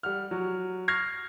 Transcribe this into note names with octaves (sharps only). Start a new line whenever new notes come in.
G3 F#5 F6
F#3
C#6 F6 G#6 A#6 C7